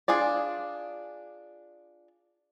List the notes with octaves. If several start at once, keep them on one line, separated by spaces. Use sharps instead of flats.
D4 F4 G#4 D5